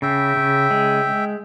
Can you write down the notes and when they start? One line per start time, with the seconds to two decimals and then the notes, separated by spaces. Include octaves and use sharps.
0.02 C#3 E5 G5
0.37 C#3
0.71 G#3